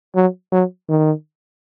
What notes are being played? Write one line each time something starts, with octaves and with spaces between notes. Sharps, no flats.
F#3
F#3
D#3